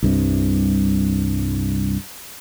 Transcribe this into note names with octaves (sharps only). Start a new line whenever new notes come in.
C2 G2 C3